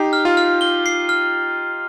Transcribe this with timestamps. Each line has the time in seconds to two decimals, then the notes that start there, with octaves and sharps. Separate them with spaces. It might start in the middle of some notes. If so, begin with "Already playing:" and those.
Already playing: D#4 G4 C7
0.13 F6
0.25 F4
0.37 F6
0.61 G7
0.86 C7
1.09 F6